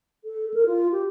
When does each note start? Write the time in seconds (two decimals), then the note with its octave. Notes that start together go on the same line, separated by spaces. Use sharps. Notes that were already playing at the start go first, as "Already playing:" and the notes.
0.24 A4
0.54 A#4
0.66 F4
0.92 G4